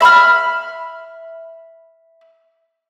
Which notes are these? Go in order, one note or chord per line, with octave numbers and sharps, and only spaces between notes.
E5 B5 C6 F6